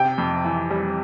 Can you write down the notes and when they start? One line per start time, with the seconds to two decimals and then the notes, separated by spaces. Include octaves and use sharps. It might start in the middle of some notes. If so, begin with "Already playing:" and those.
Already playing: C3 G5
0.18 F2
0.45 E3
0.70 G3